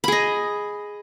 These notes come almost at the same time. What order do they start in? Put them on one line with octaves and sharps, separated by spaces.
B5 G#4 D#5